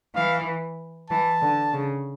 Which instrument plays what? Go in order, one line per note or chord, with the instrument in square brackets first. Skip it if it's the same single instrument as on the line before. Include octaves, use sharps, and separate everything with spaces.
[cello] E3 [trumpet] F5
[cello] E3 [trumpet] A5
[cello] D3
C#3